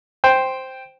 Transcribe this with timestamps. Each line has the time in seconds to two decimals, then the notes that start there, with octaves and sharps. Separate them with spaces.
0.24 C5 G5